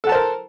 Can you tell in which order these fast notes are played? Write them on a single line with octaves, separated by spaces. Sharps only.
A4 F#5 A5 C5 A#4